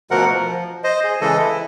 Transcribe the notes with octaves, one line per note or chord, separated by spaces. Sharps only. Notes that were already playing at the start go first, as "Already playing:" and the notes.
D2 B2 F3 A#4 F#5
F3
C5 D#5
G#4
C#3 E3 G#3 A4 D#5
E4